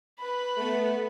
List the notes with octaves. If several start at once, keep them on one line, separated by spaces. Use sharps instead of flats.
B4 B5
A3 B3